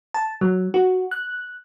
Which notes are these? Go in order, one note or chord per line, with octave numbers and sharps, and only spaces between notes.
A5
F#3
F#4
F#6